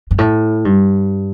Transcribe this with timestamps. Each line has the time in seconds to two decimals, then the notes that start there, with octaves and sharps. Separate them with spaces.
0.11 G2
0.18 A2
0.65 G2